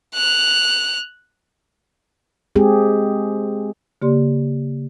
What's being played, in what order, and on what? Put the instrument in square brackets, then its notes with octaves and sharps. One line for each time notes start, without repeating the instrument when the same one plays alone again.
[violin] F#6 F7
[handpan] G#3 C4 G4 G#4
[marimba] C#3 A#3 G4 D5 C6